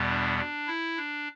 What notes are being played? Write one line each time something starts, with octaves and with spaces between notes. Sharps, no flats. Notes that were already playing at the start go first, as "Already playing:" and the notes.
Already playing: E2 B2 G3 B3
D4
D4
E4
D4